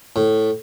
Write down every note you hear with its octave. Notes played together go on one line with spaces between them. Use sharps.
A2